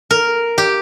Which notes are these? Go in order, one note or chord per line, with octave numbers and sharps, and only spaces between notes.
A#4
G4